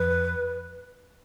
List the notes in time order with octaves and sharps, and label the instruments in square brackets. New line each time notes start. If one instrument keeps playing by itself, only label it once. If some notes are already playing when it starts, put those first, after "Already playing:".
Already playing: [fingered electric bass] F2 [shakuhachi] B4